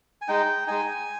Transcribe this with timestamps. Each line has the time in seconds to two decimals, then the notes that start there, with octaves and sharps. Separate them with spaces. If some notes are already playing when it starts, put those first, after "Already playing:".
0.22 G#5
0.28 G#3 D#4 G5
0.68 G#3 D#4 G#5